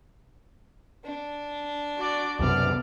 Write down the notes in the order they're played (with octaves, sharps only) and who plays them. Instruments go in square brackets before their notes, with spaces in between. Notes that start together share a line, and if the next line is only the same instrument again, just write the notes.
[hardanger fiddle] D4
[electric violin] F#4 D5
[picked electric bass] C2 F#2 B2 [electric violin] D5 F6